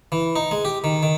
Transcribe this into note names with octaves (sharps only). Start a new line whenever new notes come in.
E3
D#4
G#3
G4
D#3
D#3